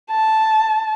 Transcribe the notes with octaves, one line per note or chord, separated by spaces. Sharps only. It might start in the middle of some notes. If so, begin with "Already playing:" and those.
A5